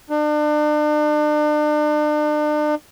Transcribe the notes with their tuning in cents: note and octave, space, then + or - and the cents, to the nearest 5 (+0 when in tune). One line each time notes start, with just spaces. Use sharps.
D4 +40